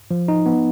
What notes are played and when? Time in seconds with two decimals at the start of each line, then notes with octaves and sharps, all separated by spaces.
0.11 F3
0.28 D#4
0.46 B3